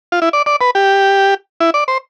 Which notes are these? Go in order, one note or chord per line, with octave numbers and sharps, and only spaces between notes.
F4
E4
D5
D5
B4
G4
E4
D5
C5